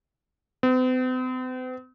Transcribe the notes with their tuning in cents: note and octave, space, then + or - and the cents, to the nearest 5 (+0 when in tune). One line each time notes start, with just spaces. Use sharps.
C4 -45